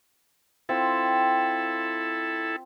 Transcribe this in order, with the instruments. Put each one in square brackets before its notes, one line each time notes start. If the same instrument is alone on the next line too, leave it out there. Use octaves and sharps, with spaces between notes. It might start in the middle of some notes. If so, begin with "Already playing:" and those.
[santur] C4 F4 G5 [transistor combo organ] E4 A4